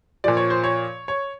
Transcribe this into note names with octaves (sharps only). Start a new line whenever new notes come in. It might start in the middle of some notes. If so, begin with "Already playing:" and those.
A#2 F3 D5
C#5
C5
C#5
C#5